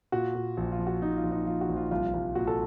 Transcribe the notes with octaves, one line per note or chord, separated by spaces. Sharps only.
A#2 F#4
A#2
A#1
F4
F3
F#4
A#2 D#4
F4
A#1
D#4
F3 F4
F#4
A#1
F4
C2 F4
C2
A#2 F#4
A4